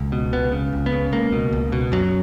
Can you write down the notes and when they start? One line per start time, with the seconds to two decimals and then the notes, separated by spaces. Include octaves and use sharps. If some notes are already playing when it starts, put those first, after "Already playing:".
Already playing: C#2
0.12 B2
0.32 C#2 B3
0.52 C#3
0.73 C#2
0.86 B3
0.92 C#3
1.12 C#2 A#3
1.32 B2
1.53 C#2
1.72 B2
1.92 F#2 F#3